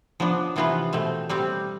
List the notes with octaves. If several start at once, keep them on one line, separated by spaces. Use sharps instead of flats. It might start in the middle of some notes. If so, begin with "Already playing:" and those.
F3 B3 D4
C3 E3 B3 F4 B4
B2 A3 C4
G3 C4 G4